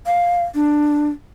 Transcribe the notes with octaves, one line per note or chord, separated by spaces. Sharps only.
F5
D4